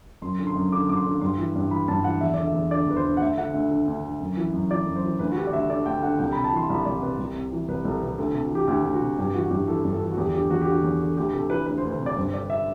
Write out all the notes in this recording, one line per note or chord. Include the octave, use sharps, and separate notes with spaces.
F#2 C6
D3
C6
F#2
D3 D6
F#2 D6
C6
D3
G2 C6
E3
G2
E3 B5
G2 A5
E3 F#5
E2 E5
D3 D5
E5
E2
D3 D5
E2 B4
C5
D3
F#5
D2 E5
D3 F#5
D2 E5
D3
D2
D3
F#2
E3
F#2
E3 D5
F#2
C5
E3
D2 B4
F#4
D3 G4
D5
D2 E5
D3 D5
D2 G5
D3 F#5
C2 G5
B5
C3
A5
E3 C6
C2 B5
C2 D5
C3 B4
C2
C3
E3
C2 B4
C2 A4
C3 B4
D2 A4
A4
C3
F#4
E3 G4
D2 G4
D2
F#4
C3
G2 G4
E3 F#4
F#4
G2 G4
E3 A4
G2
A4
E3
F#4
E2 G4
D3 G4
E2 F#4
G4
D3
F#4
E2
D3
D2 G4
C3 A4
E3 B4
D2 B4
C5
D2 B4
C3
D5
G2 C5
D3 D5
E5